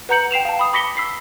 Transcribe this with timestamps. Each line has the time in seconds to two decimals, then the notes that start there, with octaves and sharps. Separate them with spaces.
0.09 B4 F#5 A#5 G6 C#7 F#7
0.31 G5 C7 E7 F7
0.45 F5 A5
0.59 B5 D#6
0.73 B5 D6 A#6 B6 C#7 G7
0.97 E6 B6 C7